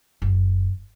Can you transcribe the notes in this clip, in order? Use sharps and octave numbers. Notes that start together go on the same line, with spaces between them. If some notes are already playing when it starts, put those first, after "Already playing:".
F#1